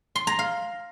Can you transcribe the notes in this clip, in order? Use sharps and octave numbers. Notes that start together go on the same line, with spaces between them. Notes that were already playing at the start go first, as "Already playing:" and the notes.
C6
A#5
F5